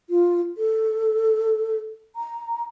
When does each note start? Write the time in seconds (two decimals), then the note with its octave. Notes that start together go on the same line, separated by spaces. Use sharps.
0.10 F4
0.58 A4
2.16 A#5